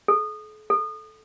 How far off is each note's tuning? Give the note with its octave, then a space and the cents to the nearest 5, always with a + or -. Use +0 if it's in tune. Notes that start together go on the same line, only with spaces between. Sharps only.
A4 -45
A4 -15